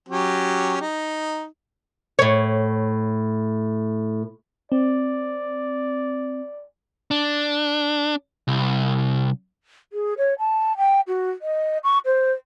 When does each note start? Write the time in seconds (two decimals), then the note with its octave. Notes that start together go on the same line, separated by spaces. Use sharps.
0.09 F#3 C#4 G4
0.81 D#4
2.19 A2 C#5
4.72 C4 D5
7.11 D4
8.48 C2
9.93 G#4
10.18 C#5
10.39 A5
10.77 G5
11.08 F#4
11.42 D#5
11.84 C#6
12.06 C5